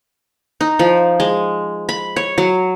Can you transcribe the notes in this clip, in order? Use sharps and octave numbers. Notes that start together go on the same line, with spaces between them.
D#4
F3
G#3
B5
C#5
F#3